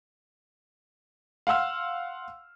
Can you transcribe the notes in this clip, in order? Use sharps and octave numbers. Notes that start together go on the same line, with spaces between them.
F5 F#5 C6 E6 F6